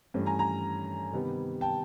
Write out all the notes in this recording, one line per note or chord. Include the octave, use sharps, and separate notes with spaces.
G2 E3 A3 C#4
G#5 A#5
G#5 A#5
C3 D#3 G3 B3
G5 A5